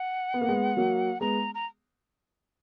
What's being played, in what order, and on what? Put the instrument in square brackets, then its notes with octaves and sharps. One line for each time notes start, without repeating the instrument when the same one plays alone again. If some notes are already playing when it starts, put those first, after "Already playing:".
Already playing: [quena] F#5
[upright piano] B3
A#3
G#3 B3
F#3 A#3
[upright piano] G#3 B3 [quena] A#5
[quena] A#5